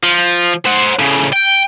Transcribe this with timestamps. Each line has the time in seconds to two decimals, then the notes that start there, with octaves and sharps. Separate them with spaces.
0.03 F3
0.65 C5 F#5
0.99 A2 C#3
1.33 G5